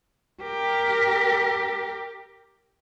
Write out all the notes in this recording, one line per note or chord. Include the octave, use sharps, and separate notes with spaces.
G4 A#4